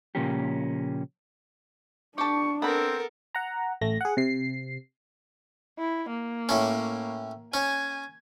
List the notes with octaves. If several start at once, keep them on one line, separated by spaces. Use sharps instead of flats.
A#2 C#3 F3 A#3 C#4 G4
D4 G4 A4 C#6
B3 C4 A4 A#4 B5
F#5 A#5
A1 A3 A#6
G#4 F#5
C3 C7
E4
A#3
A2 C#4
C#4 G#5